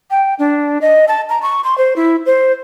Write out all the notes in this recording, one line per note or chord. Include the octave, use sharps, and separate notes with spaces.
G5
D4
D#5
A5
A#5
C#6
C6
C5
E4
C5